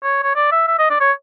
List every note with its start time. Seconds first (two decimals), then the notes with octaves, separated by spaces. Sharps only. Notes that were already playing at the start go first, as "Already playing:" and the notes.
0.03 C#5
0.23 C#5
0.35 D5
0.52 E5
0.67 E5
0.79 D#5
0.90 D5
1.00 C#5